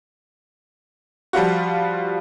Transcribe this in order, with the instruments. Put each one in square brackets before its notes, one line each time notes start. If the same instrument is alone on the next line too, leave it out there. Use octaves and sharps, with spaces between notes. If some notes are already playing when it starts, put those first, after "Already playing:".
[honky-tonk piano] F3 G3 F4 F#4